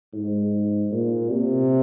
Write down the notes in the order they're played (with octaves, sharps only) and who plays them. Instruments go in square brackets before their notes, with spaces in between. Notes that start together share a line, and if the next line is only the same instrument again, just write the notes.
[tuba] G#2
A#2
C3